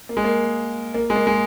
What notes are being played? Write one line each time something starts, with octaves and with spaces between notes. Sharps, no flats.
A#3
G#3
A#3
A#3
G#3
A#3
G#3